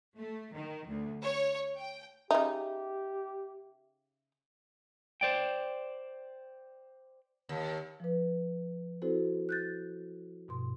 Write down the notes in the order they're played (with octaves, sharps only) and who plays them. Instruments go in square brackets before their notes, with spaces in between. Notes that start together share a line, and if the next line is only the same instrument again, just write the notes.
[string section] A3
D#3
D2
C#5
G5
[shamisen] C#3 D#4 [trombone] G4 [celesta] E5
[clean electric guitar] C5 D5 G5
[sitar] D#2
[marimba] F3 B4
C4 E4 F#4 A4 C5
F#6 G6 A6
G2 B2 C6